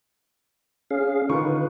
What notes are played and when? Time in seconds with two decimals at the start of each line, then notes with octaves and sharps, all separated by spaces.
0.91 C#4 G#4 F5
1.29 D3 D#3 F4 B4 C#6